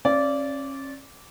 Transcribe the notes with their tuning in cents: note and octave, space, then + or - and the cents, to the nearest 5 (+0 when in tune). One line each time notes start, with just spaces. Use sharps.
C#4 -35 D5 -15 F5 -40